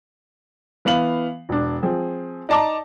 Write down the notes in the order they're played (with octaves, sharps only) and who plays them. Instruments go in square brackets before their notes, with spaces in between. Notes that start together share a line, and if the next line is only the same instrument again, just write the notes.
[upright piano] E3 B3 F5 F#7
E1 D4
F3 C4 G#4
D#4 D5 A5 A#5 D6